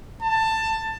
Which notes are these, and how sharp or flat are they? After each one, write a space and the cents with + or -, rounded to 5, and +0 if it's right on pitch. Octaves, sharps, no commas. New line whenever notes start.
A5 +15